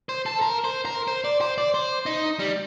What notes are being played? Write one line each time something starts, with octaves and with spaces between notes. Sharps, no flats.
C5
A4
A#4
C5
A#4
C5
D5
C5
D5
C5
D#4
G3